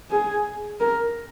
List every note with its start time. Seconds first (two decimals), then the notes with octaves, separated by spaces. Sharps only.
0.11 G#4
0.80 A#4